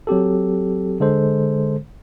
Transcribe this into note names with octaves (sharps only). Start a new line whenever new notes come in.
F#3 C4 G4 A4
D3 G#3 A4 C5